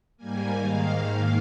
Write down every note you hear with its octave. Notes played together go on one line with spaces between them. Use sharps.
G#2 G3 A#3 G#5
G#2 D#3 A#3 F5